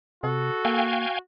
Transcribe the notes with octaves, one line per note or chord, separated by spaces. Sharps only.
C3 F#4 A4
A#3 F5 G5 G#5